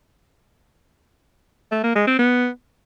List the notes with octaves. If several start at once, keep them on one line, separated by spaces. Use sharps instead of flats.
A3
A#3
G#3
C4
B3